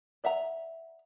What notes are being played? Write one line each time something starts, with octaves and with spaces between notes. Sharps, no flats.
D5 E5 F#5 A#5